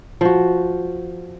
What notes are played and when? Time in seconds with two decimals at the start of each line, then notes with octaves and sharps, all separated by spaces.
0.21 F3 F#4